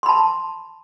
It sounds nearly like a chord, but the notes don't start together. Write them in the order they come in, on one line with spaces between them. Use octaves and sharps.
C6 B5 A5